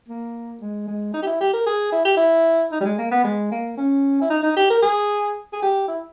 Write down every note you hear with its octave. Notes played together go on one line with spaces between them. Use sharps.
A#3
G#3
G#3
D#4
G4
E4
G4
A#4
G#4
E4
G4
E4
D#4
G3
G#3
A#3
B3
G#3
A#3
C#4
E4
D#4
D#4
G4
A#4
G#4
G#4
G4
E4